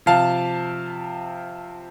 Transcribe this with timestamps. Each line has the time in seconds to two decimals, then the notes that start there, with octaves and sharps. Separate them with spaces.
0.06 C3 F3 F5 A5